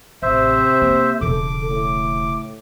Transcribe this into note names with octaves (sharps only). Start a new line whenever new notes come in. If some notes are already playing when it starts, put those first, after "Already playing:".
A1 C3 C5 E5
A#3
E1 C#3 A4 D6
A2